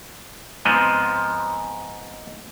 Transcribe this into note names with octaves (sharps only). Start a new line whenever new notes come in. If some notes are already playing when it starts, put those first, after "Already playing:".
G#2 F3 B3 C4 D#5